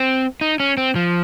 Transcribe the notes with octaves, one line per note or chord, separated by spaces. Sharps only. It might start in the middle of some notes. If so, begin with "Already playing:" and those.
Already playing: C4
D#4
C#4
C4
F3